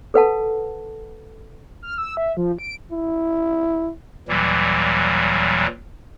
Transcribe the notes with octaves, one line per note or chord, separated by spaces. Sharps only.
A4 B4 F#5 A5
F6
E6
E5
F3
D7
E4
D#2 A#2 E3 F#3 G3